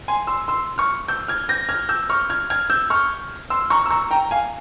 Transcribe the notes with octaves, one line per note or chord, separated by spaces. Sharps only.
G#5 C6
C6 E6
C6 E6
C#6 F6
E6 G6
F6 G#6
G6 A#6
F6 G#6
E6 G6
C#6 F6
F6 G#6
F6 G#6
E6 G6
C#6 F6
C6 E6
A#5 C#6
E6
A#5 C#6
G5 A#5
F5 G#5